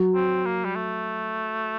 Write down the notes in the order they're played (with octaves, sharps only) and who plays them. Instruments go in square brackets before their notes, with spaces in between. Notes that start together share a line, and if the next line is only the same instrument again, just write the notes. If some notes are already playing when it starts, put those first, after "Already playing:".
Already playing: [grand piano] F#3
[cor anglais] C4
A#3
G3
A3